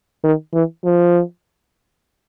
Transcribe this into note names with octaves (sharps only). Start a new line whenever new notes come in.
D#3
E3
F3